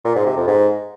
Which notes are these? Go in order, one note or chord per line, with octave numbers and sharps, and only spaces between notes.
A#2
G#2
C3
F2
G#2